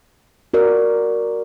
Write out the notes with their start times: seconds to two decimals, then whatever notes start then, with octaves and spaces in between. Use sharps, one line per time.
0.54 F#4 A#4 D5